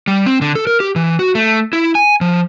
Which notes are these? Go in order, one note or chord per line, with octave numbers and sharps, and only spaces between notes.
G3
C4
D3
A4
A#4
G4
E3
F#4
A3
E4
G#5
F3